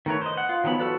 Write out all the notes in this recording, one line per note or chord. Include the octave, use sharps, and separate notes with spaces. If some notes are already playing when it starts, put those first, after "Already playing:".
D#3 A3 A#4 B4 C#5
C5 D#5
F#5
F4
D#3 F3 F#3 B3 B5
E4 F#4 A4 B4 D5